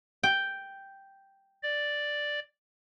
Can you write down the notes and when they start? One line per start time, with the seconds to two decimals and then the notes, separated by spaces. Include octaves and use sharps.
0.23 G5
1.63 D5